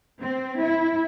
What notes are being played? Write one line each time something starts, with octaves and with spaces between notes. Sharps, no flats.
C4
E4